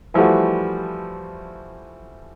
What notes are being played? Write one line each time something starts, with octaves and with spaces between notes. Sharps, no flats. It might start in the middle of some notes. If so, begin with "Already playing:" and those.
E3 F3 G3 A3 F#4